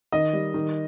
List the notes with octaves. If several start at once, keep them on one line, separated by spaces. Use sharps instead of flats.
D#3 D#5
G3
D#3